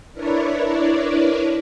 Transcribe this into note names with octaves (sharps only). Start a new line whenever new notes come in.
D4 E4 A#4 B4 C#5 D5